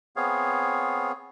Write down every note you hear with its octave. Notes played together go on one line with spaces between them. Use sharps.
B3 C4 G#4 C#5 F5